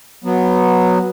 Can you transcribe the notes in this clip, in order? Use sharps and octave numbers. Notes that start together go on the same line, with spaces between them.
F#3 B3